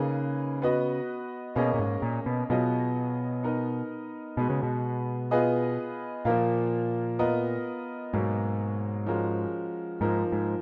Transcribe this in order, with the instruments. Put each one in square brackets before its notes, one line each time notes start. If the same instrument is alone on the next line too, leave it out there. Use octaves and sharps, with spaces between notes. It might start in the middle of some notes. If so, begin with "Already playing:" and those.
Already playing: [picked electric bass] C#3 [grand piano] A#3 D#4 G#4 B4
[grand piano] B3 F#4 B4 D#5
[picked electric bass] B2 [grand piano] A#3 C#4 G#4 D#5
[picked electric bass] A#2
G#2
A#2
B2
[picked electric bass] B2 [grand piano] F#3 B3 F4 G#4 D#5
[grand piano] B3 D#4 A#4 D#5
[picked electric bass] B2 [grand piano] G#3 B3 F#4
[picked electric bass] C#3
B2
[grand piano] B3 F4 G#4 B4 D#5
[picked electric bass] A#2 [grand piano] F3 A#3 F4
[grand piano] B3 F4 A#4 D#5
[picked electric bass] G#2 [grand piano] B2 F#3 A#3
[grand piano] F3 G#3 C#4 F#4 A#4
[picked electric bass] G#2 [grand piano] F3 A#3 D#4 A#4
[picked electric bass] G#2